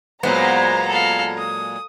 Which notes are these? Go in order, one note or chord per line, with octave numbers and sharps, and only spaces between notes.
A#2 F#3 G#3 B3 C5 A#5
A4 F5
D#6